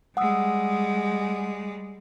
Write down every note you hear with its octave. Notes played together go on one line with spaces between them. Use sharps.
G3 G#3 F#5 D#6 E6